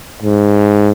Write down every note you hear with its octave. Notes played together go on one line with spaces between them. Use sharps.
G#2